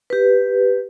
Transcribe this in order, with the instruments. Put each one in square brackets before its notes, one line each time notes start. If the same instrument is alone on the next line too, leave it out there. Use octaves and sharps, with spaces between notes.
[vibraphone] G4 B4